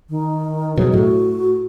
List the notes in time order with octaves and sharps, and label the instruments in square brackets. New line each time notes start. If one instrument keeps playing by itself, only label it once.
[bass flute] D#3
[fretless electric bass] B2 F#3 [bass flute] G#4
[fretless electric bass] A2 [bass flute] F#4